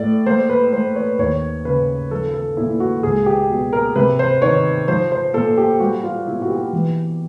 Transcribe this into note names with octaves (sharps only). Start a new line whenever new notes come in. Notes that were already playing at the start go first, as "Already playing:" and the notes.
Already playing: A2 A3 D5
A#3 C5
B4
A#3 C5
C#5
D#2 C#5
C#3 B4
F3 A4
A4
A#2 E4
F#4
C#2 G#4
G4
B2
A#4
C3 B4
C5
D#3 C#5
F3 C5
C5
A#2 A4
G4
G3 F#4
F4
B2 E4
F#4
G4
E3